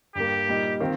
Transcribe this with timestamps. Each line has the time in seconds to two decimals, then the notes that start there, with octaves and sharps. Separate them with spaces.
0.15 G2 G3 A#3 G4
0.48 A#2 G3 D#4
0.80 D#3 C4 F4